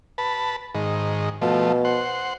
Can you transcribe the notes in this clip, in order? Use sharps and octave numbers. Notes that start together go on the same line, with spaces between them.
B4 A5
G#2 D#3
B2 F3 A3
C5 F#5